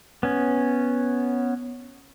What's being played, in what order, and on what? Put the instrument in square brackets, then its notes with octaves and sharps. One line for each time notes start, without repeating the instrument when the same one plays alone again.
[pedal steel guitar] B3 C#4